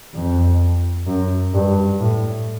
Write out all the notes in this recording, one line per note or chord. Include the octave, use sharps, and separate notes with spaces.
F2
F#2
G2
A2